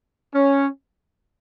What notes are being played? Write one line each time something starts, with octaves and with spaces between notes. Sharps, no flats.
C#4